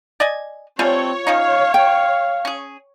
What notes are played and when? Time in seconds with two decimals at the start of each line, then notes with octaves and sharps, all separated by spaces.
0.20 D5 D#5 G#5
0.79 G3 A3 C4 F4 C#5 G#5
1.27 F3 C#4 D#4 F5
1.74 F5 G5
2.45 C#4 G#4